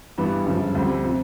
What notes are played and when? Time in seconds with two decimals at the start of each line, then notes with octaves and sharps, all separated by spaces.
0.18 G2 E3 G3 B3
0.46 G1 F#2 C#3 F3
0.75 D2 D3 G3 C4
1.03 C3 F3